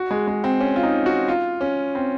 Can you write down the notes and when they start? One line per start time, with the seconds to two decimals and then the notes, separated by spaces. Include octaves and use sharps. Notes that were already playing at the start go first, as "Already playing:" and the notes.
Already playing: F#4
0.11 G#3
0.27 G#3
0.44 C4
0.60 C#4
0.76 F4
0.83 D#4
1.06 F#4
1.28 F4
1.61 C#4
1.95 C4